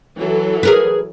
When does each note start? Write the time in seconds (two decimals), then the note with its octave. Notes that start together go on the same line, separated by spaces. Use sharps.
0.18 E3 F#3 A4
0.63 G#4 A#4 B4